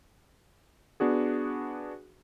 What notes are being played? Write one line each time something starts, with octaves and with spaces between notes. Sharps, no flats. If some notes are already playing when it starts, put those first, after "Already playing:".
B3 D4 F#4 G#4